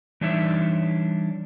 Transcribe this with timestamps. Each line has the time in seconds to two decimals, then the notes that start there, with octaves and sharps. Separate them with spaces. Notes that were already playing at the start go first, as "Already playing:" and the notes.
0.21 E3 G3 D4 D#4 C#5 E5